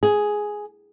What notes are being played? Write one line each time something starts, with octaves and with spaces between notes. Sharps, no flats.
G#4